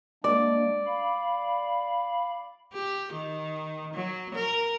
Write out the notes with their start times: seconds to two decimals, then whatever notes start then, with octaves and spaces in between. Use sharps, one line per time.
0.24 G#3 A#3 D4 D5
0.86 F5 B5
2.73 G4
3.13 D#3
3.93 F#3
4.35 A#4